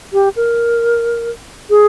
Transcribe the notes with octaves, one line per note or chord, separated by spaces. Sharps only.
G4
A#4
G#4